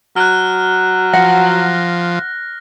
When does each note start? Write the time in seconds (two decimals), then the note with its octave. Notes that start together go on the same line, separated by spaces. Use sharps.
0.16 F#3 F6 F#6
1.13 F3 F#5 A#6